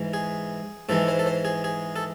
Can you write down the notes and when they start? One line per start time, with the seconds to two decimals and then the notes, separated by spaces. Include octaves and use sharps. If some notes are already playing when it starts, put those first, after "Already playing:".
Already playing: G#2 E3 G#3
0.13 G#4
0.89 G#2 E3 G#3 A4
1.08 C5
1.19 A4
1.26 C5
1.45 G#4
1.64 G#4
1.96 A4